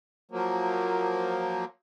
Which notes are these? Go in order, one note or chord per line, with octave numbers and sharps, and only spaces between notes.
F3 F#3 A#3